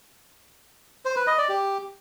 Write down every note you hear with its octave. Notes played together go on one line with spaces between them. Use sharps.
C5
B4
D#5
D5
G4